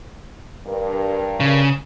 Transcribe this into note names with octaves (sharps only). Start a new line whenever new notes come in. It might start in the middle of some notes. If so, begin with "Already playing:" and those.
G2 A#4
C#3